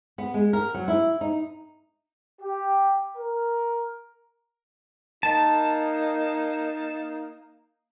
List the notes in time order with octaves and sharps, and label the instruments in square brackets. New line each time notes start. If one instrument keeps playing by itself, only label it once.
[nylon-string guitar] B3
G#3
A#4
F#3
E4
D#4
[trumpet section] G4
A#4
[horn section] A#3 D#4 [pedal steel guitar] A5